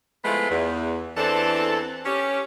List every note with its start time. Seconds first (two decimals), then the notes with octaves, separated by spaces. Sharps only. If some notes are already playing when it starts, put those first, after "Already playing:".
0.25 F3 G#3 A3 B3 E4 F4
0.50 E2
1.17 E2 E3 C4 D4 A4
2.06 C#4 G4